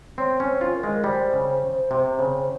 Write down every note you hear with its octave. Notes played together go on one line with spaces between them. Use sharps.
C4 C#5
C#4
C5
F4
A#4
G#3
G3 C5
C#3
C3
C#3